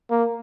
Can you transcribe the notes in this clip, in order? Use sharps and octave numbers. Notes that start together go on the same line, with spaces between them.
A#3